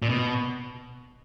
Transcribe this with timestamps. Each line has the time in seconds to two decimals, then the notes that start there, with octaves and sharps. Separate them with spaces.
0.02 A#2
0.09 B2